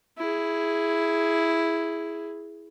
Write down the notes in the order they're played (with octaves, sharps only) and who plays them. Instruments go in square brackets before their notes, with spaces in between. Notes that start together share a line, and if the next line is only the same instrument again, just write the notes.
[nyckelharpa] E4 G#4